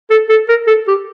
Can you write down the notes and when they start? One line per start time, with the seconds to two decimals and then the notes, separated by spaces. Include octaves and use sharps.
0.10 A4
0.30 A4
0.49 A#4
0.67 A4
0.88 G4